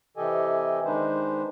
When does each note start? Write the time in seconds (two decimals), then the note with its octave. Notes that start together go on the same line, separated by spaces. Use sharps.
0.17 C3 E3 G4 A4 D#5 G#5
0.85 D#3 G#3 D4 D#4 B4 C5